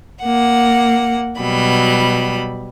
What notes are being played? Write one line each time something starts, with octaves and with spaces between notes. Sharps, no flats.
A#3 F#5
B2 F#3 G3 B5